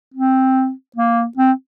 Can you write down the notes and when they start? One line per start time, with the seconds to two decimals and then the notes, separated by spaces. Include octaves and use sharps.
0.14 C4
0.96 A#3
1.37 C4